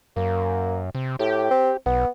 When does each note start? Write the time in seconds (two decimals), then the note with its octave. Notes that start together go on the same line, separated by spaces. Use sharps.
0.16 F#2 A#3
0.95 C3
1.19 A2 G4
1.51 C4
1.86 B1 B3